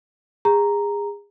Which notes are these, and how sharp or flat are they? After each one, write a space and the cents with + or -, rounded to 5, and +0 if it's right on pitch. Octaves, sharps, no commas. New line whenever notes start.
G#4 -30 A#5 +0